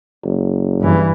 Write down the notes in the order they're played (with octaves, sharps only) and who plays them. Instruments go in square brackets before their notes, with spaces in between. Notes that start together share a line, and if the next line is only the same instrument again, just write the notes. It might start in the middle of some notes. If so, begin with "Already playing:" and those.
[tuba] F#1
[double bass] G2 E3